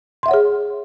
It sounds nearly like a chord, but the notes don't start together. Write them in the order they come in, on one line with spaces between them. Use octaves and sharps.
C6 E5 F#5 C#5 G#4